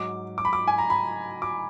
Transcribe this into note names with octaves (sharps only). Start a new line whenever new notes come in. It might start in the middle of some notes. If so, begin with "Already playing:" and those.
Already playing: G#2 F#3 D6
D6
B5
D6
G#5
A#5
B5
D6